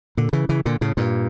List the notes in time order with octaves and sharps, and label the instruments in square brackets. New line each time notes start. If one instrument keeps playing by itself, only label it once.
[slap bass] A#2 D3
C#3 E3
C#3 E3
A#2 D3
A2 C#3
G2 A#2